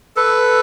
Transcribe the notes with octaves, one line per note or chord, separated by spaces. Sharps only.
A4 B4